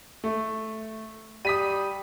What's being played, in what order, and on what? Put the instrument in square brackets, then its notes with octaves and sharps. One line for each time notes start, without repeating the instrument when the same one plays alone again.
[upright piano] A3
[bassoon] G3 [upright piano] D#6 B6 D#7